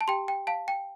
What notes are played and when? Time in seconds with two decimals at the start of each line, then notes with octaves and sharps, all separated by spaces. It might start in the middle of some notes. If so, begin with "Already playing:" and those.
0.01 A5
0.08 G4 G5 C6
0.28 G5
0.47 F5 A5
0.68 G5